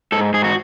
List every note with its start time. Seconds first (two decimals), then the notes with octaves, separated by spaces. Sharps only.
0.12 G#2 A4
0.34 G#2 G#4
0.44 F#4